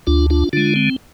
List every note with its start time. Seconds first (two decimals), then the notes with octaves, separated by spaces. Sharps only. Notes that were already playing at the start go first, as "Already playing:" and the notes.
0.07 D2 D4 F4
0.30 D4 F4
0.53 D3 G#3 D4 F4
0.76 C4